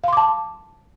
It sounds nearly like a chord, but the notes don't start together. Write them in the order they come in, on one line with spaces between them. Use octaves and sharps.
F5 C6 D6 A5